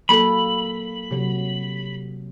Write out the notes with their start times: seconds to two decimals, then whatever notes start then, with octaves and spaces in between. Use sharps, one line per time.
0.09 F#3 A#3 A4 B5
1.11 C3 F#3